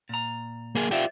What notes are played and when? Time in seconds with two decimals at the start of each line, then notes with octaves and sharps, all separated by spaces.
0.09 A#2 A#5
0.75 A#3 G#4
0.91 F4 G4 C5 D5 E5